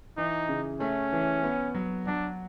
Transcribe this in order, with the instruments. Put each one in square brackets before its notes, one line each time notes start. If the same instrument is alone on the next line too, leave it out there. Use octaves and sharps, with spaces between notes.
[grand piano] E3 [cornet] D#4
[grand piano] C#3
[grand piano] A3 [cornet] C#4
[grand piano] E3
B3
F#3
[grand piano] F#3 [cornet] D4